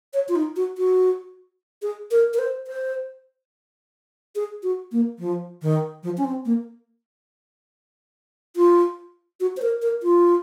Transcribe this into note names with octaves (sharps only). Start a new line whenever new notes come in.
C#5
F4
D#4
F#4
F#4
G#4
A#4
A#4
C5
C5
G#4
F#4
A#3
F3
D#3
F3
C#4
C4
A#3
F4
F#4
C5
A#4
A#4
F4